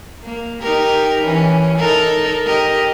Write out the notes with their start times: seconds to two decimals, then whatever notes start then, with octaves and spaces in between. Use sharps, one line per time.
0.23 A#3
0.61 D#4 G4 A#4
1.24 E3 C#4
1.78 D#4 A4 A#4
2.46 G4 A#4 D#5